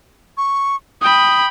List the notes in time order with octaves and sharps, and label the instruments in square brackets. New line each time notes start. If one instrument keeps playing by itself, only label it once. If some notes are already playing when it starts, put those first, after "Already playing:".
[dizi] C#6
[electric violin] G5 B5 [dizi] D#6